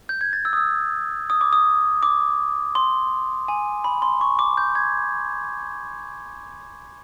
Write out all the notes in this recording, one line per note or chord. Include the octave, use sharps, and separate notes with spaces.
G6
G#6
A6
E6
D#6
E6
D#6
D6
D#6
D6
C6
G#5
B5
C6
C#6
D6
G6
G#6